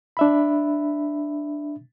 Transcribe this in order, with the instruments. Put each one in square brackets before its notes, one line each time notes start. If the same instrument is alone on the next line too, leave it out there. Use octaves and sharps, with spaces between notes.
[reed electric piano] D4 E5 B5